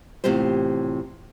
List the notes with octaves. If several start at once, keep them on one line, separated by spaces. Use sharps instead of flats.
E2 A2 C3 F4 G4 C5